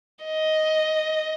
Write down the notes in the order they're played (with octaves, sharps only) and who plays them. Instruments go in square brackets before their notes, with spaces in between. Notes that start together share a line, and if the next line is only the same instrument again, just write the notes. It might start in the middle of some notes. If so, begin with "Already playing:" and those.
[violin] D#5